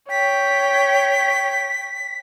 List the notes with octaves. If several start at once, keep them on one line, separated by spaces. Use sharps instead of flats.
C#5 G5 B6